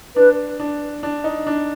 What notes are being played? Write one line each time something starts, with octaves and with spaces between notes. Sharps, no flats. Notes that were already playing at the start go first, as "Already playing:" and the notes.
D4 B4
D4
D4
D#4
D4